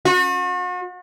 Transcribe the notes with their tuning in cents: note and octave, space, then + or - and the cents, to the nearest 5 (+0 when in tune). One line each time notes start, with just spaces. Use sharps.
F#4 -40